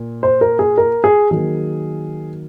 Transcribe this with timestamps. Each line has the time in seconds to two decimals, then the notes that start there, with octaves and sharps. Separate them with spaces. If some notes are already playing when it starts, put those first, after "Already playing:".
Already playing: A#2
0.23 C5
0.41 A#4
0.59 G#4
0.78 A#4
1.04 G#4
1.31 D#3 F#3 A#3 G#4